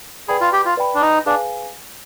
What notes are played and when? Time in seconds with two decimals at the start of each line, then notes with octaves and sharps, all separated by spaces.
0.28 G#4 B4 D5 G5 B5
0.41 F4
0.53 G4
0.66 F4
0.77 B4 D5 G5 B5
0.95 D4
1.01 D#4
1.26 D4 G#4 B4 F5 G#5